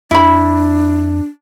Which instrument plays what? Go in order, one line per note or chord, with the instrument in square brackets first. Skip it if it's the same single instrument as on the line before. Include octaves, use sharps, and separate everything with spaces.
[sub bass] F2 [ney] D4 [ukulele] E4 B5